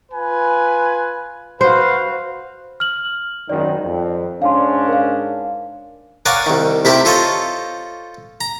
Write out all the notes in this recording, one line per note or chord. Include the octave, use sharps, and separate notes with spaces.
F4 B4 G#5
F#4 B4 C5 F5
F6 F#7
G#1 F#2 D#3 D5
F2
G#2 C#4 D4 F5 C6
A#4 F5
A#4 C#5 D5 F5 F#5 G#5
C2 D#3
C3 A3 E4 G4 A#4
F4 A4 C5 C#5 D#5
A#5